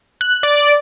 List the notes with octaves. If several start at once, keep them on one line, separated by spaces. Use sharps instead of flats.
F#6
D5